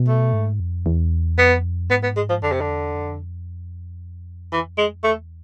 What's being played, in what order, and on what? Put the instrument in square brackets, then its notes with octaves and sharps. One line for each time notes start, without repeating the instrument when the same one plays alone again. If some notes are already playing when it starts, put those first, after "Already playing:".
Already playing: [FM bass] B2
[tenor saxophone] A3
[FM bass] G#2
F2
E2
[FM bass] F2 [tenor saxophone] B3
[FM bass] G#2 [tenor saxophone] B3
[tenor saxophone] B3
G#3
F3
[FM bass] F2 [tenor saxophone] D3
[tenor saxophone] C3
D3
[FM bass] E2
F2
[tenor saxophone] E3
G#3
[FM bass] E2 [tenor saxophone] A3